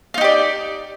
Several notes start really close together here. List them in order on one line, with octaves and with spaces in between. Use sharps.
F4 D#4 G4 D5